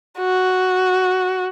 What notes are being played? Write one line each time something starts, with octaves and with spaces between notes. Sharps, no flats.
F#4